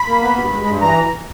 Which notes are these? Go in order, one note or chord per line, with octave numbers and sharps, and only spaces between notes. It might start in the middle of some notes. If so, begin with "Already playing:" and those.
Already playing: B5
A#3
B3
G2
G#3
G2
E3 A#5